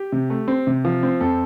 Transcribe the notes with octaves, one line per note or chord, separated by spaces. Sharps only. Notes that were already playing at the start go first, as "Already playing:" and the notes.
Already playing: G4
C3
A3
C4
C3
F3
C4
F2 A4